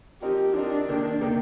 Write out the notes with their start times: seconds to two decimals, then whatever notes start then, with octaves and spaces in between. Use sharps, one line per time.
0.22 F3 C4 D#4 G4 A#4
0.55 F3 C4 D4 D#4 A#4
0.89 C3 D#3 A#3
1.21 C3 D#3 A#3